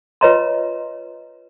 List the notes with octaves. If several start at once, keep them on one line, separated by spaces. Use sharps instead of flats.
F4 B4 C#5 D#5 A#5 C6